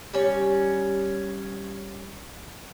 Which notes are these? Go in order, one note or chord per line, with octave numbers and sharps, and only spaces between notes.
G3 C#4